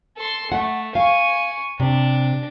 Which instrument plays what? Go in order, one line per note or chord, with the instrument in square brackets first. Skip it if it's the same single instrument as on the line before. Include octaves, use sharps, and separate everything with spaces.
[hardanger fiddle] A4 C6
[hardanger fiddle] A3 [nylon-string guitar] F#5
[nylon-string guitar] F5 [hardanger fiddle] G#5 C#6
[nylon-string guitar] C3 [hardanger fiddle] D4